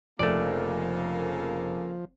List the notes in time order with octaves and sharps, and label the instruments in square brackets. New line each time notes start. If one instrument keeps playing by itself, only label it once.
[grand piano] F1 [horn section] C#3 A#3 A4 [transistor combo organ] F3 [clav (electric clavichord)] A3 D5